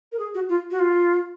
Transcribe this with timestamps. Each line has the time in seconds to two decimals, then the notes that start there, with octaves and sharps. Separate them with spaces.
0.12 A#4
0.19 G#4
0.34 F#4
0.49 F4
0.71 F#4
0.79 F4